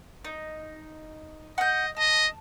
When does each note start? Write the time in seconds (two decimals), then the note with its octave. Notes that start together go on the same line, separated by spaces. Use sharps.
0.24 D#4
1.58 D#5 F#5 G6
1.97 D#5 A5